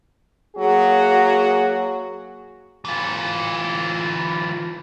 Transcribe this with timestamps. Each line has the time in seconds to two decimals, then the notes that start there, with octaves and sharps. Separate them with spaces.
0.57 F#3 A#3 F#4 G#4
2.85 E3 F4